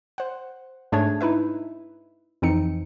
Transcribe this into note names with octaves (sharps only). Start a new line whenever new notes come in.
C5 F#5
G#2 A3 D4 G#4 C#5 G#6
D#4 E4 B4 E5
F2 E3 C4 D#4 C#7